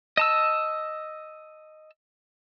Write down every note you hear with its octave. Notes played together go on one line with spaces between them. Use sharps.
D#5 A5 E6